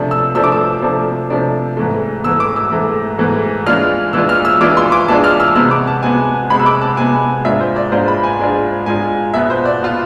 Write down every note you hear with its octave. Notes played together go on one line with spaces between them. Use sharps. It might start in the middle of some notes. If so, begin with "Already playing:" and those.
Already playing: C3 F3 A3 D4
E6
C3 F3 A3 D4 E6
D6
E6
C3 F3 A3 D4
C3 F3 A3 D4
G#2 E3 A3
G#2 E3 A3 E6
D6
E6
G#2 E3 A3
G#2 E3 A3
E3 G#3 D4 F4 F6
E3 G#3 D4 F4 E6
F6
E6
E3 G#3 D4 F4 D6
C6
D6
E3 G#3 D4 F4 A5
F6
E6
C3 G#3 B3 E6
D6
A5
C3 G#3 B3 G#5
C3 G#3 B3 B5
E6
D6
A5
C3 G#3 B3 G#5
G#2 G#3 D4 F4 E5
C5
D5
G#2 G#3 D4 F4 C5
B5
G#5
G#2 G#3 D4 F4
G#2 G#3 D4 F4 G#5
B2 B3 F4 E5
C5
D5
B2 B3 F4